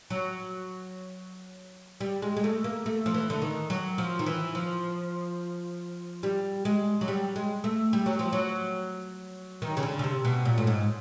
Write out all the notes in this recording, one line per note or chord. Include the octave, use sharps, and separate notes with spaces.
F#3
G3
G#3
G#3
A3
A#3
A3
F3
E3
D3
D#3
F#3
F3
D#3
E3
F3
G3
G#3
F#3
G3
G#3
A3
G3
F#3
F3
F#3
D#3
C#3
D3
C#3
C3
B2
A#2
A2
G#2